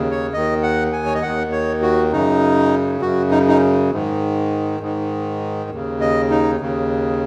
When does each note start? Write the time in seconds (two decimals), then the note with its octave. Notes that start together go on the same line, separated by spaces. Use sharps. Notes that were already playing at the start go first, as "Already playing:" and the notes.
Already playing: D#2 C#3
0.11 C#5
0.33 D#2 D#3 D#5
0.63 F#5
0.93 G#5
1.06 C#5
1.14 D#5
1.22 D#2 D#3 F#5
1.52 C#5
1.82 F#4
2.12 F#2 C#3 D#4
3.01 F#2 C#3 F#4
3.31 D#4
3.48 D#4
3.91 G#2 D#3
4.81 G#2 D#3
5.70 D#2 C#3
6.01 D#5
6.30 D#4
6.60 D#2 C#3